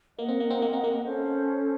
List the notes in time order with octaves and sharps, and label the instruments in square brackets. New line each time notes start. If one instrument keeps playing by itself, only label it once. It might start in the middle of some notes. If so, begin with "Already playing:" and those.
[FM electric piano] A#3 [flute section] A#4 D#5 F#5
[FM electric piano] C4
A#3
C4
A#3
C4
A#3
[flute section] C#4 A4 C5